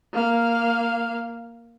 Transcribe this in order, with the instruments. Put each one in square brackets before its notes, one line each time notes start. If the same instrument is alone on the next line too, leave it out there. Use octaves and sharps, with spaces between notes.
[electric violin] A#3 F5